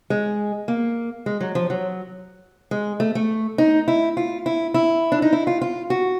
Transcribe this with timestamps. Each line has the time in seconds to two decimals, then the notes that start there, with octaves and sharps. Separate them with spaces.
0.10 G#3
0.68 A#3
1.26 G#3
1.40 F#3
1.55 F3
1.70 F#3
2.71 G#3
3.00 A3
3.15 A3
3.58 D#4
3.88 E4
4.17 F4
4.46 E4
4.74 E4
5.12 D4
5.22 D#4
5.33 E4
5.47 F4
5.61 F4
5.90 F#4